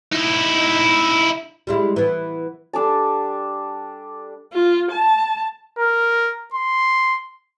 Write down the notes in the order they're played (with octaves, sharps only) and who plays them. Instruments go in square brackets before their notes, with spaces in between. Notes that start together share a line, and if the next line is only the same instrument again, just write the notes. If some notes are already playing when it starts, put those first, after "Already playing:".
[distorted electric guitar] D#4 E4
[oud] G3 G#3 E4
E3 B3
[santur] G3 D4 A4 A5
[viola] F4
A5
[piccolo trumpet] A#4
C6